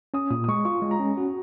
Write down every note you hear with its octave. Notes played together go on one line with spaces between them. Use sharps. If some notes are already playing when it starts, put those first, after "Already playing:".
C#4 D#6
A#2 D#6
D#6
G#3 C#6
F4 C#6
G#3
A#5
C#4
F#4